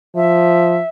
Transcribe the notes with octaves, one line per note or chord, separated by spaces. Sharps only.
F3 E5